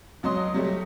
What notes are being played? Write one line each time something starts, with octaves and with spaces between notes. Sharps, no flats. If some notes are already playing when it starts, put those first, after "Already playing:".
C#2 F#3 D#5 C6 D#6
F#3 G3 A3